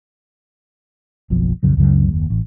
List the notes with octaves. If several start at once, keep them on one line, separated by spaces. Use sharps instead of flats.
F#1 B1 B2 F3
B1 F2 C#3 F#3
C#2 F#2 C#3 F#3
F#1 D#2
A1